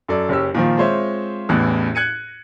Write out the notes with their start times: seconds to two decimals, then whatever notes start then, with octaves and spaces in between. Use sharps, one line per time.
0.08 F#2 A4 D5
0.29 F#1 C#4 G4 E6
0.54 A#2 D#3 F3
0.77 G#3 C4 F4 C5 C#5 E5
1.49 A1 E2 A2 E3 F#6
1.95 F#6 G#6 C#7 D#7